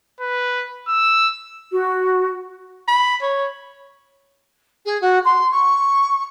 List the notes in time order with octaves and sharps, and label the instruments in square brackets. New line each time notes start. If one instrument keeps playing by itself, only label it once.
[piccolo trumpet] B4
E6
[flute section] F#4
[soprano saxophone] B5
C#5
[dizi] G#4
F#4
C6
C#6